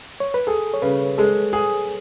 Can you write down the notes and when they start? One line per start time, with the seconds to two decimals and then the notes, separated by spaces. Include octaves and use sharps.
0.20 C#5
0.34 B4
0.47 G#4 A4
0.74 C#5
0.82 C#3 B4
1.18 G#3 A4
1.53 G#4